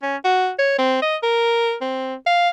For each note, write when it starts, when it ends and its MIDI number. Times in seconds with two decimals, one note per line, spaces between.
0.02 0.17 61
0.25 0.51 66
0.59 0.77 73
0.78 1.01 60
1.02 1.16 75
1.23 1.75 70
1.81 2.15 60
2.27 2.49 77